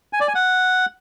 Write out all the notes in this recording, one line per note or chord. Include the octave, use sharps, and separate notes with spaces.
G#5
D5
G#5
F#5